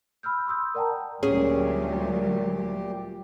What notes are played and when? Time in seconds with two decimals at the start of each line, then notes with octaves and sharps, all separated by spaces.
0.23 B5 E6 F6 G6
0.47 C6 D#6 E6 G6
0.75 A#4 D5 F#5 G5 A5 A#5
1.23 D2 A#2 F#3 G3 C#4 G4 G#4